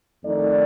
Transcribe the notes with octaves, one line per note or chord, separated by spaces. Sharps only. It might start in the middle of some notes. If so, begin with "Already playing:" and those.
F2 D#3 A3 D#4 D5